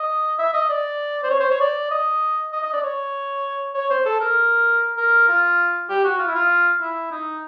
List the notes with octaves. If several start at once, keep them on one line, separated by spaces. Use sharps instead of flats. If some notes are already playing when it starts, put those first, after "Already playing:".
Already playing: D#5
E5
D#5
D5
C5
C#5
C5
C#5
D5
D#5
D#5
D#5
D5
C#5
C#5
C5
A4
A#4
A#4
F4
G4
F#4
F4
E4
F4
E4
D#4